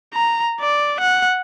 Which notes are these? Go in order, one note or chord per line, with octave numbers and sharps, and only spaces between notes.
A#5
D5
F#5